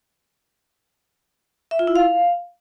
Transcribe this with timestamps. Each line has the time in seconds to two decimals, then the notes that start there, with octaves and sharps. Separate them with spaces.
1.71 E5
1.79 F4
1.87 E4
1.96 F5